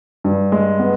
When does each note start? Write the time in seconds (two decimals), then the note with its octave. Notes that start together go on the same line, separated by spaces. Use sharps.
0.24 G2
0.52 G#3
0.79 B3